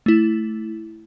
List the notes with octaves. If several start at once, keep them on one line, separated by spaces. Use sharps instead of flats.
A3 E4